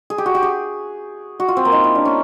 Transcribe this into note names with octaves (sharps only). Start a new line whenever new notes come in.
G#4
G4
F#4
G4
G#4
F#4
F4
C4
A#3
D#4
E4
D4
C#4